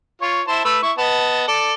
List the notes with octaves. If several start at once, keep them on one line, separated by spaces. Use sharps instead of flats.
F4 C#5
E4 C5 A5
A3 B4 E6
E4 C#6
B3 D#5 A5
A4 D5